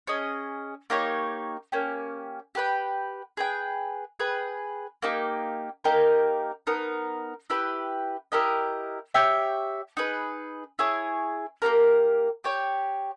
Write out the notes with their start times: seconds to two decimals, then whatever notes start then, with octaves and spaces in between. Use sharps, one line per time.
0.07 C#4 G#4 D#5
0.90 A#3 D#4 G4 C#5
1.72 A#3 C#4 G4
2.55 G4 B4 G5
3.37 G#4 B4 G5
4.20 G#4 B4 G5
5.02 A#3 D#4 G4
5.84 A#3 D#4 G4 A#4
6.67 B3 D#4 A#4
7.50 E4 G4 B4 G5
8.32 E4 G4 A#4 D#5
9.14 G4 C#5 E5 G5
9.97 D#4 G#4 B4
10.79 E4 G#4 C#5 G#5
11.62 A#3 C#4 G4 A#4
12.44 G4 C#5 G5